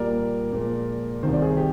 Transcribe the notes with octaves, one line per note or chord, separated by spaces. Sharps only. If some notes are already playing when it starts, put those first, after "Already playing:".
Already playing: A#2 G3 A#3 A#4 D5
A#2 F3 G#3
C2 C3 D#3 C5
D5
G#4 C5
G4